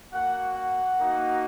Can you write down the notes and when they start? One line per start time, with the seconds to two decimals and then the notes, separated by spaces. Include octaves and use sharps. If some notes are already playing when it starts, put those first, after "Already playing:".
0.12 A#3 F#4 F#5
0.56 F#5
0.98 A#3 D#4 F#4